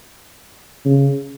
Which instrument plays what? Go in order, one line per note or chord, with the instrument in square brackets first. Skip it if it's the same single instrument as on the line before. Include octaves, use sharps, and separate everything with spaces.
[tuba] C#3